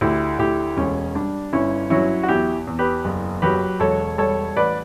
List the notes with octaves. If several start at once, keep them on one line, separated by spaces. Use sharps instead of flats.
D2 E4 G4
D2 E4 G4
E1 C#4
G3 D4
G1 C#4 E4
F#3 C#4 E4
F#4
E2 E4 G4
E2
G4 B4
F#1
F#3 G4 B4
E1 A4 C#5
G3 A4 C#5
A1 B4 D5